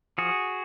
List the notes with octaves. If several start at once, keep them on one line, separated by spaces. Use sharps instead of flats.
F3 F#4 G#4